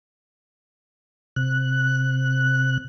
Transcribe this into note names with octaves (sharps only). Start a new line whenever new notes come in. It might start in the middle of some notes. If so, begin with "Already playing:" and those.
C3 F#6